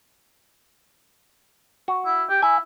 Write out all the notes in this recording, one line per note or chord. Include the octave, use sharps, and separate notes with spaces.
F#4
E4
G4
E4 G#5